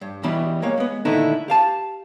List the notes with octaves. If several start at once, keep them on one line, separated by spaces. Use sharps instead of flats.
G2
E2 B2 E3 G3 G4 E5
G#3 A#3 C#5 F5
G#3 B3
A#2 D3 D#3 A3 D#4 E4
G4 F5 A5